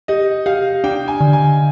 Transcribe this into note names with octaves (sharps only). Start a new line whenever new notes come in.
G4 D#5
G4 F5
D4 G5
G#5
D3
G#5